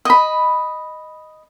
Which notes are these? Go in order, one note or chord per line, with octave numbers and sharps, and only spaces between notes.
D#5 B5